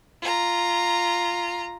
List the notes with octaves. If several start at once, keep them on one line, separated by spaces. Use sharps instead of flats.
F4 A#5